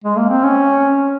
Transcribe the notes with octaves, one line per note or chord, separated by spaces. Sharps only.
G#3
A#3
C4
C#4